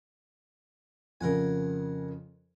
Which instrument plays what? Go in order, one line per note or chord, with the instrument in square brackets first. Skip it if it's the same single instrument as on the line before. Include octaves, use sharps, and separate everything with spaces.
[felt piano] F2 C#3 [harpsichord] A#4 F#5 G#5